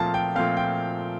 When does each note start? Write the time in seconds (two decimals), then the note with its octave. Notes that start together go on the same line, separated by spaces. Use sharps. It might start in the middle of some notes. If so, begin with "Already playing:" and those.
Already playing: A#2 F3 A3 C4 F5 A5
0.14 G5
0.36 A#2 F3 A3 C4 F5
0.57 G5